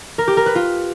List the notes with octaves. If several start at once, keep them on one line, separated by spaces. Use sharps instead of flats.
A#4
G4
A#4
B4
F4